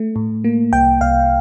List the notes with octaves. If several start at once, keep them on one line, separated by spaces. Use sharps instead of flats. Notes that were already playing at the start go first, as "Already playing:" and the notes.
Already playing: A3
A2
A#3
C2 G5
C2 F5